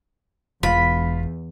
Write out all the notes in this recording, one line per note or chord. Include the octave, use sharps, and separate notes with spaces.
E1 E2 F4 B5